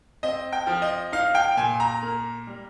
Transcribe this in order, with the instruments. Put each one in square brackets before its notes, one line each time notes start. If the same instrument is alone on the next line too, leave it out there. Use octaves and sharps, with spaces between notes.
[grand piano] C4 D#5
G5
F3
D#5
D#4 F5
G5
A#2 G#5
A#5
A#3
G3